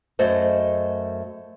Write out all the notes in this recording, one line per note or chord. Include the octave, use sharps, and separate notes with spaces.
F#2 A3 A4 C5 D#5